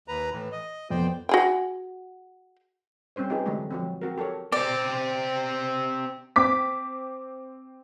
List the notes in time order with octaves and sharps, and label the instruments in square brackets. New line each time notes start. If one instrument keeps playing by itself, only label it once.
[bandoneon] D#2 B4 A#5
A2 E3
D#5
[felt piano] F2 B3 [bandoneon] C5 D5 G5
[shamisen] F#4 G#4 G5
[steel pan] G3 C4 C#4 C5 C#5
C4 D#4 F4 G4 G#4 B4
D3 E3 F#3 G#3 A3 G4
F3 F#3 C4
C4 F#4 A#4
G4 A4 A#4 C#5
[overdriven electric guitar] C4 G4 [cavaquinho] D5
[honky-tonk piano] C4 D6 B6